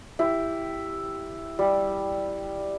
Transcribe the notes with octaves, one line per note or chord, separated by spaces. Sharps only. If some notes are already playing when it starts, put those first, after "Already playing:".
E4 G4
G3